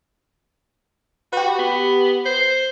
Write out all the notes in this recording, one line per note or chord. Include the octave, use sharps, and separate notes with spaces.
F#4 G4 B4
B3
C5